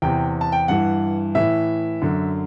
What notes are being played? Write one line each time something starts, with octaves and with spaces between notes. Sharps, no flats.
E2 C3 E3 G5
A5
G5
G2 E3 F#5
A2 E3 E5
F#2 D3